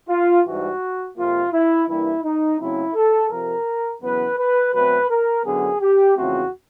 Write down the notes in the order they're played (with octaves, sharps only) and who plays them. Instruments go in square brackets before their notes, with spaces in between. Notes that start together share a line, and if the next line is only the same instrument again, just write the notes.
[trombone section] F4
G#2 E3 G3 F#4
F2 C3 F3 A#3 F4
E4
G2 E3 G3 A#3 E4
D#4
C#3 F#3 A3 C4 E4
A4
F2 C3 F3 A#4
E2 C#3 F#3 B3 B4
B4
B2 F#3 A3 C4 B4
A#4
F#2 D3 F#3 B3 G#4
G4
E2 C#3 F3 A3 C4 F#4